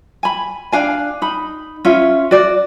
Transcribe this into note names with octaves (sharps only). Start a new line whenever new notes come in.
G#5 B5
D4 F5 G#5
D#4 B5
C#4 F4 E5
F#4 D5